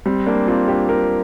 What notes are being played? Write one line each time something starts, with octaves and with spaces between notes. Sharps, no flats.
G3 C4
A#3 D4
C4 F4
D4 G4
F4 A#4